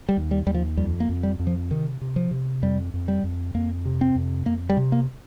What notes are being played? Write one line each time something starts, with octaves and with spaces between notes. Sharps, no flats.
G3
D#2
G3
D#2 G3
F3
F2 G3
A#3
F2
G3
F2
F3
C3 D#3
C3
F3
C3
F2 G3
F2
G3
F2
F2 A#3
C3
C4
F2
F2 A#3
G3
C3
A#3